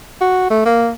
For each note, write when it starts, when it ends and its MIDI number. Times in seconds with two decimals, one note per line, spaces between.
0.21 0.48 66
0.51 0.63 57
0.65 0.90 58